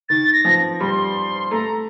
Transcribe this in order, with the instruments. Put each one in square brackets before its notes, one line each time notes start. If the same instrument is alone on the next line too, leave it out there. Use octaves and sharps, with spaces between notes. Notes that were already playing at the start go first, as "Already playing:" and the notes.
[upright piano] D#3 [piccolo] A6
[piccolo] A#6
[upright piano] F3
[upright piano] G3 [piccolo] C6
[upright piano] A3 [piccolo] A#5